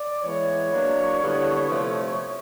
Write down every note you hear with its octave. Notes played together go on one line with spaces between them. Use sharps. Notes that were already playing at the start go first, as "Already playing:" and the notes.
Already playing: D5
E3 G#3 B3 E4 C#5
F#3 A#3 D4
D3 G3 B3 E4
C3 F3 A3